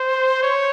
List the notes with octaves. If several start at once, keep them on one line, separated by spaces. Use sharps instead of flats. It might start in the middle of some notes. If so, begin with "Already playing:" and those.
Already playing: C5
C#5